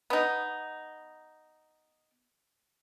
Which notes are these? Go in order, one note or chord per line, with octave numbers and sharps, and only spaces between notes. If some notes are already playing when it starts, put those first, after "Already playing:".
B3 D#4